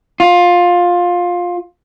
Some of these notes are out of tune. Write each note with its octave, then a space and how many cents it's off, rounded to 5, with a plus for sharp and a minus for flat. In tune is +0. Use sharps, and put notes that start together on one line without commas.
F4 +15